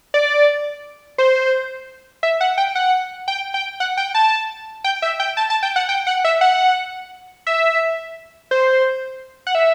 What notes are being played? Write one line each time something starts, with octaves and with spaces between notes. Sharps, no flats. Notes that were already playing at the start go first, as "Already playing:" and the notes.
D5
C5
E5
F#5
G5
F#5
G5
G5
F#5
G5
A5
G5
E5
G5
A5
A5
G5
F#5
G5
F#5
E5
F#5
E5
C5
F#5
E5